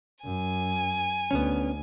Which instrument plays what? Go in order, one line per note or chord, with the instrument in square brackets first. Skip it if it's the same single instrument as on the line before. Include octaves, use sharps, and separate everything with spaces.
[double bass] F#2 [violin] G#5
[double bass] D2 [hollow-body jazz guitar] B3 C#4